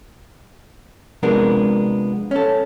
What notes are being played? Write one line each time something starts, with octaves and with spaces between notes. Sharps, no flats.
C3 F3 G#3 B3 D4 A#4
C#4 A4